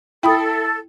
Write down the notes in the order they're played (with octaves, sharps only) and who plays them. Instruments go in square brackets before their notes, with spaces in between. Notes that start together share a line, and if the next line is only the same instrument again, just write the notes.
[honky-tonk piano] E4 [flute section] A4 [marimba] G5 B5 D#6